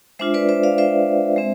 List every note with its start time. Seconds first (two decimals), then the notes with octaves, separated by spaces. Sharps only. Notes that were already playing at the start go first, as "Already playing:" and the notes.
0.19 G#3 D4 F4 C5 E5
0.34 B4 D5
0.49 C5 E5
0.63 D5 F5
0.78 C5 E5
1.36 G#3 C4